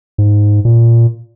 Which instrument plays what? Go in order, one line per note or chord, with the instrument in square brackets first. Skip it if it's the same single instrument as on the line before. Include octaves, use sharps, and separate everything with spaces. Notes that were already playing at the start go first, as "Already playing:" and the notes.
[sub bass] G#2
A#2